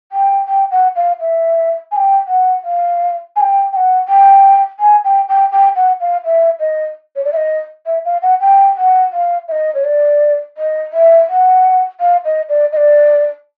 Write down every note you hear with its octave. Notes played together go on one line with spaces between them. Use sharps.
G5
G5
F#5
F5
E5
G#5
G5
F#5
F5
G#5
G5
G5
F#5
G5
G#5
G5
G5
G5
F#5
F5
E5
D#5
C#5
D5
E5
D#5
E5
F5
F#5
G5
F#5
F5
E5
D#5
C#5
D5
D#5
E5
F#5
F5
D#5
D5
D#5
D5